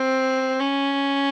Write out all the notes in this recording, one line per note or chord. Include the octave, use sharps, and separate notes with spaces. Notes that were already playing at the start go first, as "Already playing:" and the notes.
Already playing: C4
C#4